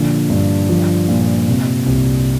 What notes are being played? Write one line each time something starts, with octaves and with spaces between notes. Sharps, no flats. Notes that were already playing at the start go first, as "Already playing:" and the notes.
Already playing: A#2 D3 F3
G2
F3
A#2
C3
C2